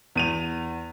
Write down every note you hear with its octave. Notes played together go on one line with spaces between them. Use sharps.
E2 D#7 F7